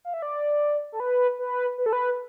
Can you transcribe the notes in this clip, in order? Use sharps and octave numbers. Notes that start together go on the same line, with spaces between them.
F5
E5
D5
A4
B4
B4
B4
A4
B4